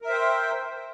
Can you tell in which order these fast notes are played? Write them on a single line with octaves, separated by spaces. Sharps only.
A#4 E5 C5 G5